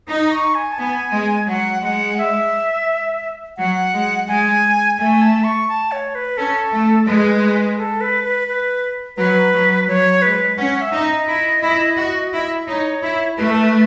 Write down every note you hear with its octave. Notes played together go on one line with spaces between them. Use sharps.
D#4 D#6
C#6
G#5
A5
B3 G#5
G#3
F#3 F#5
G#3 F#5
E5
F#3 F#5
G#3
G#3 G#5
A3 G#5
A5
C#6
A5
C#5
B4
C#4 A4
A3
G#3 B4
A4
B4
B4
B4
F#3 B4
F#3
F#3 C#5
G#3 B4
C#4 F#5
E5
D#4
D#5
E4
E4
F#4
E4
D#4 C#5
E4
A3 B4
A4
B4